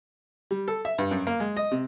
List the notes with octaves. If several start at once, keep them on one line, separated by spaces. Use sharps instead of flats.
G3
A4
E5
G2
F#2
A#3
G#3
D#5
C3